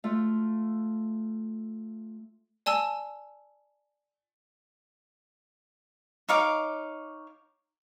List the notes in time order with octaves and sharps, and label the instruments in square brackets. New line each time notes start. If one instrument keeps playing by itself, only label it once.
[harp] A3 F4
[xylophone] D5 G#5 A5 E6
[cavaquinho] D#4 C#5 F5 D6